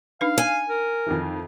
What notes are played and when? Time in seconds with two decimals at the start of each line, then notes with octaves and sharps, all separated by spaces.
0.21 D4 D#4 B4 F5
0.38 G#5
0.68 A#4
1.06 F2 D#3 E3